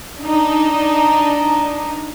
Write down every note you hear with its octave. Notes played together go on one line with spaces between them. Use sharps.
D4 D#4